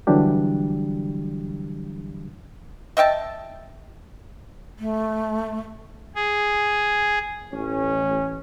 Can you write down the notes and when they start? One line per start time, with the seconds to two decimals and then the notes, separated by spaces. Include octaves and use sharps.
0.07 D3 E3 F#3 G3 D4 G4
2.97 D#5 E5 G5 A5
4.79 A3
6.16 G#4
7.53 A1 C#4